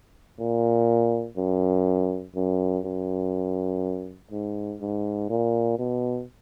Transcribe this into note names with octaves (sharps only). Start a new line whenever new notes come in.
A#2
F#2
F#2
F#2
G#2
G#2
A#2
B2